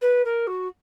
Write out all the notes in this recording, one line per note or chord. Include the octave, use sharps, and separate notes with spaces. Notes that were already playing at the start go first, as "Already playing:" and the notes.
B4
A#4
F#4